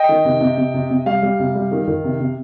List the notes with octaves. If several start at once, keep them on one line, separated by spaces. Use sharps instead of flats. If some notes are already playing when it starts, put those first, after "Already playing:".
Already playing: D#5 G5
D#3
C3
C3
C3
C3
C3
G3 F5
G3
C3
G3
D#3
D#3
C3
C3